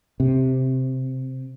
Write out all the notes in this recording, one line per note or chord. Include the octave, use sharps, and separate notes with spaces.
C3